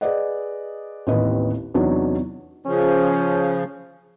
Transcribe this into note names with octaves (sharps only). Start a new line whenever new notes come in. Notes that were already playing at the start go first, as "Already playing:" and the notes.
G#4 B4 D5 D#5 F#5
A1 D#2 C4 B4 D#5
E2 C3 F#3 D4 D#4 C#5
C#3 F3 C#4